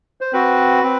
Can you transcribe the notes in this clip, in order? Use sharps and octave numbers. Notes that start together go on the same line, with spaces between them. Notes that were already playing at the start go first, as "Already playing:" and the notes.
C5
C4 F#4 B4
C4